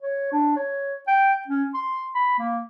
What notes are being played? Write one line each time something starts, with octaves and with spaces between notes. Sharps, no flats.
C#5
D4
C#5
G5
C#4
C6
B5
A#3